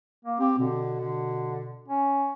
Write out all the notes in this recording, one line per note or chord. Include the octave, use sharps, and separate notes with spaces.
A#3
C4 G4
B2 D3
D3
C#4